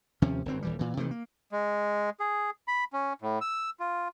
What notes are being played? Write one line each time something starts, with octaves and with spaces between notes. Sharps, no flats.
D#2 C3 F3 C#4
G1 F#2 C4
D#1 E3 G3
A#2 E3
C3 D#3 E3 A3
A#3
G#3
G#4
B5
C#4
A2
E6
F4